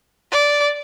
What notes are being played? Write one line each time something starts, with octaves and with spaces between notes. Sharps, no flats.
D5